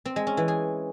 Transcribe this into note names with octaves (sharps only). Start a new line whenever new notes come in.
C4
G#3
C#4
E3
G#4